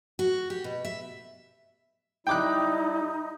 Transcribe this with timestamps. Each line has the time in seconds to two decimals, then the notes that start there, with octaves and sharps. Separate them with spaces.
0.19 F#4
0.50 G4
0.64 B2
0.85 E5
2.27 G3 D#4 E4 G5 D6 F#6